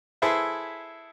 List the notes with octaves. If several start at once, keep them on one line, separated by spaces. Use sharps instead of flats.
E4 G#4 A4 B4 C5 E5